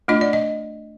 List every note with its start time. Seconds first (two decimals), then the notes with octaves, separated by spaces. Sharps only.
0.08 A3 D4 F4 D#5
0.21 D5
0.33 D#5